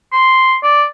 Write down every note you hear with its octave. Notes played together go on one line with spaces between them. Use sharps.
C6
D5